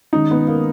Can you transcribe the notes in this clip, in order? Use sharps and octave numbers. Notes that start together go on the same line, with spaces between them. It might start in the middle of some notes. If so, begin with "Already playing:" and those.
D#3 G#3 C#4 D#4
B3
A#3